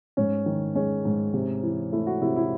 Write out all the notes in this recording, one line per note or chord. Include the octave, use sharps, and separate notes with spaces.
G#2 C#4
D#3
G#3 C#4
G#2
C3
E3
A3 E4
F#4
C3 E4
E4